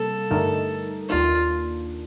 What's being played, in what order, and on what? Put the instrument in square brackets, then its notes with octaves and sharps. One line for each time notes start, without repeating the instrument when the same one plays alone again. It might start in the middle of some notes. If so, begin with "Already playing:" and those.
Already playing: [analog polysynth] C3 G3 A#3 [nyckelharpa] A4
[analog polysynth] G2 D3 A3 D#4 A#4
[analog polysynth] D#2 D#3 A#3 D4 [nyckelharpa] F4